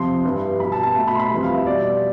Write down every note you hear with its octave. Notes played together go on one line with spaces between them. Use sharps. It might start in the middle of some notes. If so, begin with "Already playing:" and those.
Already playing: F2 C3 F3 C6
G2 E3 G3
B2 G3 B5
A5
A5
B2 A3
B5
C6
B5
F2 E3 G3
F5
E5
B2 G3 D5